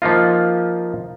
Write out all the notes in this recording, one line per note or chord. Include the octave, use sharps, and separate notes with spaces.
F3 A#3 D#4 F4